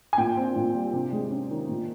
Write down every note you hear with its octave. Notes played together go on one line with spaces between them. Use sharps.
G#5
A#2 G5
C4
A#2
G3
C3
G#3
C#4
D#3
A#2